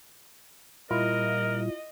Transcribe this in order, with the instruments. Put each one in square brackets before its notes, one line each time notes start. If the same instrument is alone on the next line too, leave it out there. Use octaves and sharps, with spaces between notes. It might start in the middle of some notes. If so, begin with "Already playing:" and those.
[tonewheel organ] A#2 G3 [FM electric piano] E4 F4 [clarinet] A#4 [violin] D#5